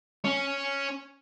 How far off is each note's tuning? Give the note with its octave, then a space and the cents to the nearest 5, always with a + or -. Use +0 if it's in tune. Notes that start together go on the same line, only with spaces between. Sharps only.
C#4 +0 C#5 +0